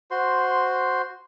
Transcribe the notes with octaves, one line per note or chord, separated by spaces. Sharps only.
F#4 C5 C6